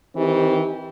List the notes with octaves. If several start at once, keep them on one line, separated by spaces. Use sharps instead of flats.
D#3 E3 C4 G4